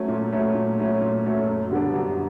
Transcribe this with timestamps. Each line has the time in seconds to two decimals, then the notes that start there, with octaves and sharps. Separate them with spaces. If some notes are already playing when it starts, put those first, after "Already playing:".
Already playing: F#3 A3 C#4
0.08 A#2
0.32 F#3 A3 C#4
0.55 A#2
0.79 F#3 A3 C#4
1.01 A#2
1.25 F#3 A3 C#4
1.48 F#2
1.71 D3 G3 B3 D4
1.94 F#2